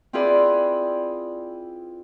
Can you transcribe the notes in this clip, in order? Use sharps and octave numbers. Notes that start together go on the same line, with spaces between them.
C4 E4 F4 G#4 B4 D5